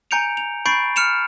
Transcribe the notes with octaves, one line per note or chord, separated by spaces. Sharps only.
G#5 A#5 G6 C#7 D7 F7
F7
B5 C#6 G6 A6 C7 D7
F6 C#7 E7 F7